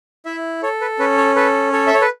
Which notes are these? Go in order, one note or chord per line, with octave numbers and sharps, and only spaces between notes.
E4 E5
A4 C#5
B4
C#4 B4
C#5
A4 B4
A4 C#5
E5
C#5
B4